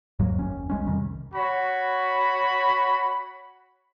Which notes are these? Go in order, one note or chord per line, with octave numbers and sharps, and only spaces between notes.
D#2 G#2 F#3 A#3
F#1 D#2 C#4
C2 G#3 C#4
F2 C3 D#3 G3
F#4 C#5 B5